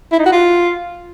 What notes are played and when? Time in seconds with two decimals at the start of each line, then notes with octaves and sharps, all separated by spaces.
0.12 E4
0.19 D#4
0.26 F#4
0.32 F4